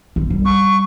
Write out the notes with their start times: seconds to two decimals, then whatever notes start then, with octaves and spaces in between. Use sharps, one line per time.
0.16 C4
0.30 G3
0.44 C#6